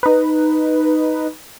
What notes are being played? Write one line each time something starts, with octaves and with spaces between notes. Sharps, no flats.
D#4 B4